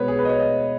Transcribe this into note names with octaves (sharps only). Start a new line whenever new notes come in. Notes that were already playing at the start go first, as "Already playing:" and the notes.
Already playing: B2 G#3 B3 B4 C#5
G#4
B4
D#5
C#5
D#5